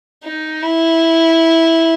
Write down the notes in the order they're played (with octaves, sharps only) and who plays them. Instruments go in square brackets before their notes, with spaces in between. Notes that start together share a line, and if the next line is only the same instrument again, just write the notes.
[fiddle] D#4
E4